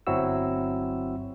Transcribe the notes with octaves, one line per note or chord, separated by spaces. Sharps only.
G1 F#3 C4 E4 F#4 E6